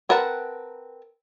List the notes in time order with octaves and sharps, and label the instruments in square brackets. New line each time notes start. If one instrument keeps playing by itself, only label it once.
[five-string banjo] C4 A#4 B4 F#5 A5